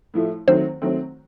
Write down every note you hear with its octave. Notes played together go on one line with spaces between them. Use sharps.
A2 F3 A3
D#3 F#3 A3 C4 C5
D#3 F#3 A3 C4